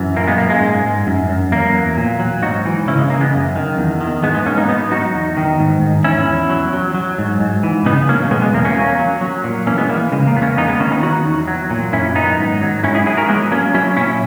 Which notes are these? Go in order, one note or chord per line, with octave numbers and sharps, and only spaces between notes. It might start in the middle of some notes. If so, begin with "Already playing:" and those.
Already playing: F#2 E3
A#2 A#3
G#3 B3
A#2 A#3
G#3
G#2
G#2
F#2
F#2
E2 A#3
F#3
A#2
F#3
G#2 D#4 F#4
E3
C#3 C#4 E4
G#3
C#3 A#3
G#3 B3
F#2
D#3
E2
D#3
G#2 G#3 B3
G#3 B3
G#2 A#3 C#4
B3 D#4
F#3 B3 D#4
F#3 D#4 F#4
E2
D#3
G#2
G#2
E2 C#4 E4
E2
F#3
F#3
F#3
G#2
G#2
E3
C#3 B3 D#4
F#3 A#3 C#4
B2 G#3 B3
G#3 B3
E2 A#3
A#3 C#4
F#3
F#3
F#3
A#2
E3 A#3 C#4
G#3 B3
E3 A#3
C#3 G#3
A#3
E2 B3
A#3 C#4
E2 B3 D#4
G#3 B3
D#3 A#3 C#4
B3 D#4
F#3 D#4 F#4
E2
F#3
A#2
F#2 C#4 E4
D#3 B3 D#4
G#2
F#3
G#2 C#4 E4
E4 G#4
F#3 E4 G#4
F#4 A#4
F#3 G#3 B3
F#3 A#3 C#4
F#3 C#4 E4
A#2 C#4 E4